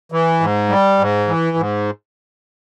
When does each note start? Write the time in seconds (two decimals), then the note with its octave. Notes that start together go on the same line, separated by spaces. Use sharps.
0.12 E3
0.40 G#2
0.69 G3
0.99 G#2
1.28 E3
1.57 G#2